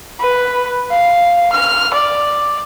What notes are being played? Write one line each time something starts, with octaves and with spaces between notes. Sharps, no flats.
B4
F5
F6
D5